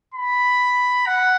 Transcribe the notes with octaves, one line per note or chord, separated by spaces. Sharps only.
B5
F#5